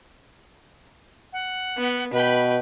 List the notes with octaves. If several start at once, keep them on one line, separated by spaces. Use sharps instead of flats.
F#5
B3
B2 B4 G5 B5